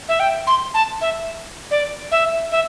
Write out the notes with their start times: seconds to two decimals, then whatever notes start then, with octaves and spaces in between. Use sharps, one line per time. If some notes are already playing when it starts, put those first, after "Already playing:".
0.08 E5
0.19 G5
0.47 C6
0.74 A5
1.01 E5
1.70 D5
2.11 E5
2.51 E5